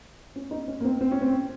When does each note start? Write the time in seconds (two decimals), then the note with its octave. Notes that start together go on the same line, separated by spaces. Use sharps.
0.36 C#4
0.51 D#4
0.68 C#4
0.80 A#3
0.84 C4
1.01 C4
1.11 C#4
1.22 C4